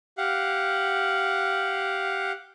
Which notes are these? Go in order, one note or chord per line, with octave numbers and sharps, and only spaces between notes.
G4 F5 F#5